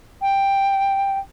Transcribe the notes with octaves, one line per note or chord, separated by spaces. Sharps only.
G5